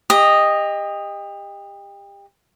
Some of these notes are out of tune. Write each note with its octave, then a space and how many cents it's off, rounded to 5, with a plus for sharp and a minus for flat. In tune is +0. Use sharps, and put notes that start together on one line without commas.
G4 +30 D#5 -5